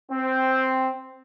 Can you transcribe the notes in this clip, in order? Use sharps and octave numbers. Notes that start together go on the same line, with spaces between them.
C4